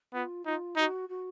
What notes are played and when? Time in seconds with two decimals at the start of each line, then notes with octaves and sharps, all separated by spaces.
0.14 B3 F4
0.46 D#4 F4
0.76 D#4 F#4
1.09 F#4